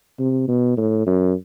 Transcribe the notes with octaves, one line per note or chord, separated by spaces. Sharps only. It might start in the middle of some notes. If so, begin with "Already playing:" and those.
C3
B2
A2
F#2